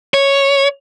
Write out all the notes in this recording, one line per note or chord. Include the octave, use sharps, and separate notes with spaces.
C#5